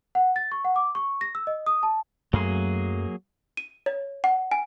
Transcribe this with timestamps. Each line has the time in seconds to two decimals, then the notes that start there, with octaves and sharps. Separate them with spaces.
0.15 F#5
0.36 A6
0.52 C#6
0.65 F#5
0.76 D6
0.95 C#6
1.21 A#6
1.35 E6
1.47 D#5
1.66 D#6
1.83 A5
2.33 F#2 F#3 A3 A#3 G#4
3.57 D#7
3.86 C#5
4.24 F#5
4.51 G#5